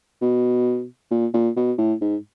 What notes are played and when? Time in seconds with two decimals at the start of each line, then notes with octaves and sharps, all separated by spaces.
0.21 B2
1.11 A#2
1.34 A#2
1.56 B2
1.78 A2
2.01 G#2